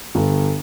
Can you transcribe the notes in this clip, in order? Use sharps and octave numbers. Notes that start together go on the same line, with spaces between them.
G1